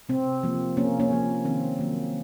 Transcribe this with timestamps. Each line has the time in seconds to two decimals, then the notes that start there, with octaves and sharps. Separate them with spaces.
0.09 C3 C4
0.43 F3 A#3
0.77 C3 A#3 C#4
1.00 A#3 C#4
1.11 F3 A#3
1.45 D#3 C4
1.79 F#3 A#3